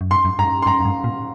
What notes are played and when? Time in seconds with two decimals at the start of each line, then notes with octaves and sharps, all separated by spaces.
0.01 F#2
0.11 G2 C6
0.25 F#2
0.39 G2 A#5
0.62 C6
0.66 G2 A#5
0.80 F#2
0.85 G2
1.04 A#2